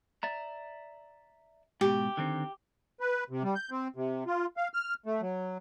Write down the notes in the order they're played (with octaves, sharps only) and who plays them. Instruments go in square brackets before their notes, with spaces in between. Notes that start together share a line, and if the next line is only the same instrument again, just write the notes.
[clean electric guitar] D5 E5 A#5
[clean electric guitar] G#2 B2 [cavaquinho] G4
[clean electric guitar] D3 D#3 C4
[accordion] B4
C3
G3
G6
C4
C3
F4
F5
F6
A3
F#3